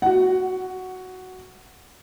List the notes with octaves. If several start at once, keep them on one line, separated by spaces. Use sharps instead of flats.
F#4 F#5